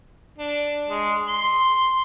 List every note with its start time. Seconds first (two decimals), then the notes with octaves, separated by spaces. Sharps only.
0.38 D4
0.89 G#3
1.28 C6